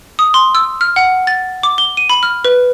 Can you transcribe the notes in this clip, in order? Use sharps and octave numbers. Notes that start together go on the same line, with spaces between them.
D#6
C6
E6
F6
F#5
A6
D6
G7
D#7
B5
F6
B4